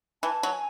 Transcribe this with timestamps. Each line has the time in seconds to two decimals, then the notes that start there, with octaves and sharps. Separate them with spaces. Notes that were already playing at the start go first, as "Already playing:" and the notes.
0.23 E3 A5
0.43 F#3
0.53 G#5